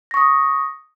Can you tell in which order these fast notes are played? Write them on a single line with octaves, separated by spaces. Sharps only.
A#6 C#6 D#6